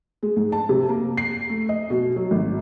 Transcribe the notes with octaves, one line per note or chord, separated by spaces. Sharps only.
G#3
G#2
A5
C3
A#3
C7
A3
D#5
B2
F#3
G#1